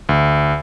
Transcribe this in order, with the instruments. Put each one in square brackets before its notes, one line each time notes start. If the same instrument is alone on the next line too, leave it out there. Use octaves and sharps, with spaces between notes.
[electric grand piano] D2